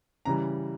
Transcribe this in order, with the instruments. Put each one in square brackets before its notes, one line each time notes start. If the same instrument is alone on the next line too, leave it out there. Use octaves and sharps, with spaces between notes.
[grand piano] C#3 E3 G3 A#5